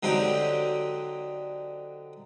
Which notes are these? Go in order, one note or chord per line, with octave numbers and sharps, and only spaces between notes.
D3 F#3 C4 D#4 G4